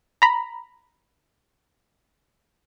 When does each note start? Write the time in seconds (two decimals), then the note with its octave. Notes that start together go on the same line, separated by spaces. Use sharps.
0.22 A#5 B5